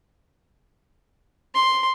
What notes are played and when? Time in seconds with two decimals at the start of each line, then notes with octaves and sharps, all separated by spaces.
1.54 C6